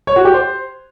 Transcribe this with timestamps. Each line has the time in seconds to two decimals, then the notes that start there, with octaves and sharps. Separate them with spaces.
0.07 C#5
0.16 F#4
0.25 G4
0.34 C5